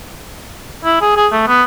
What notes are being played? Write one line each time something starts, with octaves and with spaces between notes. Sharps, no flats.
E4
G#4
G#4
A3
B3